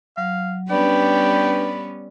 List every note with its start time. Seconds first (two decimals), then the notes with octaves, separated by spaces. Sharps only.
0.17 F#3 F5
0.70 G3 B3 C#4 D4 B4 D5 G5 B5